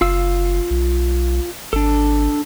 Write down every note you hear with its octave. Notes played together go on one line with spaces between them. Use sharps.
F#1 F4 F5 E6
B1
G#1 D4 A4